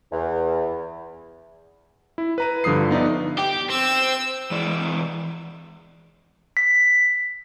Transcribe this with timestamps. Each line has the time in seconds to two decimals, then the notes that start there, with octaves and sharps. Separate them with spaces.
0.12 E2
2.18 E4
2.38 B4 A#5 D#7
2.64 G2 D3 F3 D#6 C7
2.91 B3 D#4 D5 E5
3.38 G4
3.70 C4 E6
4.51 E3 G#3 D5
6.57 B6